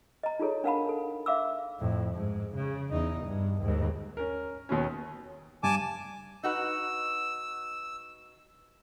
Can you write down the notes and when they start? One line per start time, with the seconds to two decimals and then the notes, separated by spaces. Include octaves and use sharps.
0.23 D#5 A#5
0.39 D#4 F4 G#4 A4 C#5
0.64 D4 A#4 F5 F#5 A5 B5
0.89 A4
1.26 E5 F5 D6 E6
1.79 F2 A2
2.15 G#2
2.55 C#3
2.92 E2 D#4
3.25 G2
3.62 D#2 G#2
4.17 C#4 A#4
4.69 D#2 B2 C#4
5.63 G2 G#5 A5 D6
6.43 D#4 F#4 B4 E6